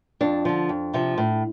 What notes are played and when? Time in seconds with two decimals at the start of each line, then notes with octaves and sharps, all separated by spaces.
0.21 F2 D4
0.45 D3 F3
0.69 F2
0.94 C3 F3
1.18 A2